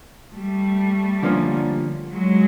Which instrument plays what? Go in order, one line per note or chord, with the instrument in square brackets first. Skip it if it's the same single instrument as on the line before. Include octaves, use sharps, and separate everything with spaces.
[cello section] G3 A3
[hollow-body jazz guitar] D3 F3 A#3 C#4
[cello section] F#3 G#3